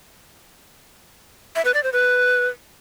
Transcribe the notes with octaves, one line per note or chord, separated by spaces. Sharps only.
E5
B4
D5
C5
B4